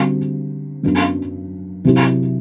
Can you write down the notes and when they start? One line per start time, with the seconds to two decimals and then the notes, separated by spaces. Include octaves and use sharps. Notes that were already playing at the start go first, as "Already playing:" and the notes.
Already playing: D3 G3 C4 F#4
0.83 F#2 F#3 B3 D4
1.84 C3 F#3 C4 E4 G4